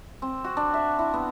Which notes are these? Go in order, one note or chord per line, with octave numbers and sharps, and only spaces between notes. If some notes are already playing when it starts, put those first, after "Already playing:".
C4
F#4
D4
E5
E4
B3